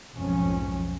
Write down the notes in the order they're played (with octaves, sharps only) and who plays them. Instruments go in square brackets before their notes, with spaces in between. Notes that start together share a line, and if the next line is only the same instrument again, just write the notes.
[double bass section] B1 F2 G#2 C#4